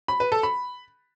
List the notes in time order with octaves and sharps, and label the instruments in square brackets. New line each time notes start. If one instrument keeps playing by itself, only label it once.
[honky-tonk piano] B5
B4
A4
B5